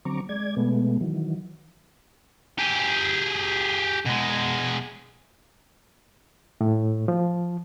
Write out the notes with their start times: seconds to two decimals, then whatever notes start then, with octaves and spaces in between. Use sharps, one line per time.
0.05 D3 F#3 C4 A#5 C#6 D6
0.29 G#3 D5 G#6
0.57 B2 G#3 A3 B3
1.01 D#3 E3 F#3
2.59 G4 G#4
4.06 B2 G#3
6.61 A2
7.08 F3